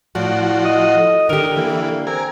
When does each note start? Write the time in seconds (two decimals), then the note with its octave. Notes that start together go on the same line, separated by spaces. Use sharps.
0.15 A2 F3 F#4 D5
0.65 D#5
0.97 A4
1.29 D3 D#3 G4 A#4
1.56 E3 A#3
2.07 C4 A#4 G#5